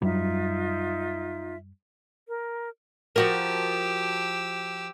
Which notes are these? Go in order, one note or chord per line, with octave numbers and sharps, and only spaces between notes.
F#2 F#3 G3 D#4 F4 E5
A#4
F3 F#4 G4 A#4 E6